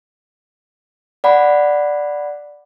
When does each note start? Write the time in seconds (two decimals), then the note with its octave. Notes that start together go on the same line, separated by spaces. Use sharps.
1.24 D5 F#5 B5